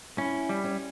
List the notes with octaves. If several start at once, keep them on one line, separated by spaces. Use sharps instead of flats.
C#4 E4
G3
C#4